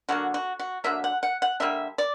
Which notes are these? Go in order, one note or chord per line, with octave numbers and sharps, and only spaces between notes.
D3 F#3 A#3 F#4
F#4
F#4
D3 F#3 A#3 E5
F#5
F#5
F#5
D3 G3 A#3 E5
D5